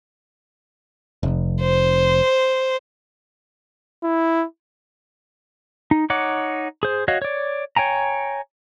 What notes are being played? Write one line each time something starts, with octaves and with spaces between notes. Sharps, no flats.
F1
C5
E4
D#4
D#4 C#5 F#5 D6
G#4 C5
F#4 C#5 D#5 F5
C#5 D5
C#5 G5 G#5 A#5